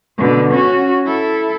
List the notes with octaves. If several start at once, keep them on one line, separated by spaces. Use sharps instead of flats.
B2 D3
C#4 F#4
E4 A4